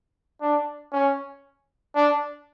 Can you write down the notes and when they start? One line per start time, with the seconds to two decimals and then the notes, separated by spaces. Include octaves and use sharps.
0.42 D4
0.93 C#4
1.95 D4